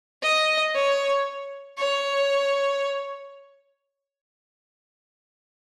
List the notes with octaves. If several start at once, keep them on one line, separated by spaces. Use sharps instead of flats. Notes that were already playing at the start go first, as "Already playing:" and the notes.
D#5
C#5
C#5